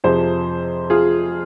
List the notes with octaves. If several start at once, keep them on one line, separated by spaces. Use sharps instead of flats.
F2 C3 F3 G#4 C5
F4 G#4